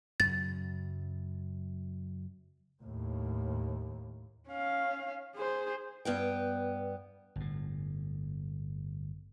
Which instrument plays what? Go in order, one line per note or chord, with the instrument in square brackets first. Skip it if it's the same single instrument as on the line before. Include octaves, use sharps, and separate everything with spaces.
[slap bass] F#2 C#3 F#3 [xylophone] A6
[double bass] D#2 A2
[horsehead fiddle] C#4 F5
G#4 C5
[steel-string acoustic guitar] G2 B3 G5
[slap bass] G1 A2